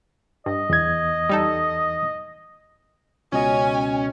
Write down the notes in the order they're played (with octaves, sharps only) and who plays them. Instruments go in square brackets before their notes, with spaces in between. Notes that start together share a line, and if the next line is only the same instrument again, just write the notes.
[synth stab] G2 [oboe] D#5
[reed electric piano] E2 E3 G#6
[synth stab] G3 D#4 A4
[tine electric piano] C#2 B2 D#5 [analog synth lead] C#4 [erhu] G#5